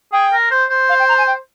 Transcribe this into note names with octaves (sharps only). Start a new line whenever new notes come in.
G#4 G5
A#4
C5
C5
F5
G5
A#5
G#5
G5